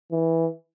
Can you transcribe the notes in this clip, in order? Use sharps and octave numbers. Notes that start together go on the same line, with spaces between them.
E3